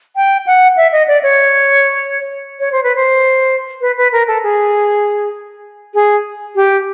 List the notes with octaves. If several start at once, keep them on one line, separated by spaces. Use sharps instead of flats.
G5
F#5
E5
D#5
D5
C#5
C#5
C5
B4
C5
B4
B4
A#4
A4
G#4
G#4
G4